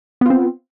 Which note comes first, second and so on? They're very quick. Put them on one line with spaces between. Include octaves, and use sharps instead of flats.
B3 F4 C4